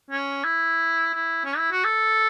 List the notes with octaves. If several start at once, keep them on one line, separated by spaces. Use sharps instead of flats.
C#4
E4
E4
C#4
E4
F#4
A4